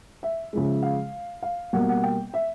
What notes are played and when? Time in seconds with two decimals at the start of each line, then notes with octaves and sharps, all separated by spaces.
0.23 E5
0.53 C#3 F3 G#3
0.83 F5
1.43 F5
1.73 B2 G3 A#3 F#5
1.89 F#5
2.03 G5
2.34 E5